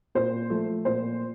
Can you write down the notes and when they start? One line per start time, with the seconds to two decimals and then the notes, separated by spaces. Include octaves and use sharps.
0.15 A#2 C5
0.50 F3 A3
0.85 A#2 C5